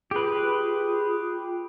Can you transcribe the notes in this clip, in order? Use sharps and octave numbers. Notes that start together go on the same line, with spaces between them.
F4 G4 G#4 B4